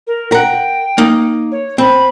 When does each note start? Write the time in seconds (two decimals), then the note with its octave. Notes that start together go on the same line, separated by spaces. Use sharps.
0.07 A#4
0.32 A#4 F#5 G5
0.98 A#3 D#4
1.51 C#5
1.78 C4 B5